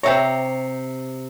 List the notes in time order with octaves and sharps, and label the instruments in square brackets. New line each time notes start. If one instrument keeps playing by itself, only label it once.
[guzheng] C3 A#5 [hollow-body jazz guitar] C#5 E5 G5